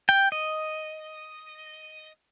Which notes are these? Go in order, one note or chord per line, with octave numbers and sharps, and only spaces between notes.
G5
D#5